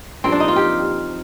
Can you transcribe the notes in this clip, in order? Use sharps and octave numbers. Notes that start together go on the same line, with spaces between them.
G2 F3 A#3 C4
D4
D#4
F4
G4